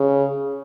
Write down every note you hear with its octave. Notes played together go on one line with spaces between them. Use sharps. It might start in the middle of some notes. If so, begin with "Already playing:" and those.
Already playing: C#3